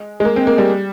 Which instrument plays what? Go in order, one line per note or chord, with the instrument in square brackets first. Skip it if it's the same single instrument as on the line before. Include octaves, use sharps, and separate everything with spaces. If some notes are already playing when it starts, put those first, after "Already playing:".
Already playing: [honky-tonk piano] G#3
G#3
A#3
C4
A#3
G3